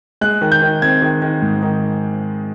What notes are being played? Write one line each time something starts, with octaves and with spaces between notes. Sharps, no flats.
G#3 F#6
D#3
G6
D#3
C4 G#6
D#3
D#3
G#2
D#3